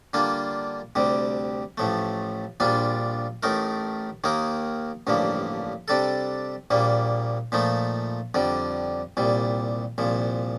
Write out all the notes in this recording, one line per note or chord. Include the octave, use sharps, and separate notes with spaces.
D3 G3 A#3 D4 F4
D2 C3 G3
A1 A2 F3 A3
A#1 A#2 G3 D4 F4
A1 A2 A3 D#4 A#4
D#2 D#3 A#3 D#4 A#4
A1 G2 D3 F3 A#3
C3 G3 D4 A4
A#1 A#2 G3 A#3
A#2 F3 A3 D#4
F2 D3 G3
C2 A#2 G3
C2 A#2 F3